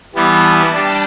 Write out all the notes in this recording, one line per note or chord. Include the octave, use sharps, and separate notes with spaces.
E3 G3 B3 A5
G3 D4 G5